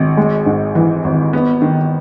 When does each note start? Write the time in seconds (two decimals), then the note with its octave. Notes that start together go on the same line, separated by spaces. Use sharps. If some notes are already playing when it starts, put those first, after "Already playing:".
Already playing: G#1
0.17 G#3
0.46 G#2
0.75 E3
1.04 G#1
1.33 B3
1.62 D#3